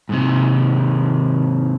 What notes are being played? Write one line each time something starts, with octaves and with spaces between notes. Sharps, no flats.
G#2 C3